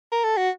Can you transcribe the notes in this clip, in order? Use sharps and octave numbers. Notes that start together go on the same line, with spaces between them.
A#4
A4
F#4